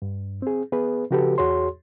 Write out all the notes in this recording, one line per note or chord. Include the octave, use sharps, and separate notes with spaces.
G2
C4 G#4
B3 G#4 B4
C#3 F3 F#4 G4 A4 B4
E2 F#4 G#4 C#5 C6